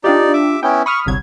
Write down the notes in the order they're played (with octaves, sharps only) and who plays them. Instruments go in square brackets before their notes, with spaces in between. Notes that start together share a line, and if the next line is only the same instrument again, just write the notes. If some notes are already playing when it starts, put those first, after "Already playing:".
[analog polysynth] D4 F4 G4 [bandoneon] D#4 D5
[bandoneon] E5 D6
[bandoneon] B3 C#4 E4 [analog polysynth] G5
[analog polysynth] B5 D#6 F6 [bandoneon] C#6
[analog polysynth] G1 C2 G#6 [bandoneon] F#3